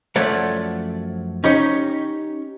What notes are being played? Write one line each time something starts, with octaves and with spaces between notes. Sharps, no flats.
F#2 F3 A3 C#5 D5 F#5
C#4 D#4 G4 C#5